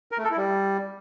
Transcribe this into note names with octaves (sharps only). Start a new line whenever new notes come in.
A#4
A3
A4
E4
G3